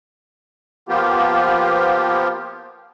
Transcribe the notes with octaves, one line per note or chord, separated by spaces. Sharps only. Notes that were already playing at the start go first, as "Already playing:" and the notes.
F3 A#3 B3 F4 G4